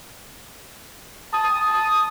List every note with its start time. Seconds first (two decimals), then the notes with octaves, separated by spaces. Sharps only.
1.33 A5 D#6
1.73 D#6